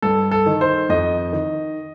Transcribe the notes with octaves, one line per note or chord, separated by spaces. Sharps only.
G2 A4
A4
D#3
C5
F2 D#5
D#3